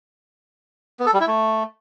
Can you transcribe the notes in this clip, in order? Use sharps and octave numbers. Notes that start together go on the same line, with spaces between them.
B3
A4
G3
E4
A3